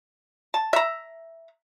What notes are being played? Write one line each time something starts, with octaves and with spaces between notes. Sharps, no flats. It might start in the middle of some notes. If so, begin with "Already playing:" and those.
A5
E5 A#5